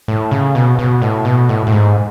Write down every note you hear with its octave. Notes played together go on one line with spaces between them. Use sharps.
A2
C#3
B2
B2
A2
B2
A2
A2
G#2